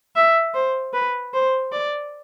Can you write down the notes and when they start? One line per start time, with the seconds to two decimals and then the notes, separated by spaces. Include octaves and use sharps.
0.16 E5
0.54 C5
0.93 B4
1.33 C5
1.72 D5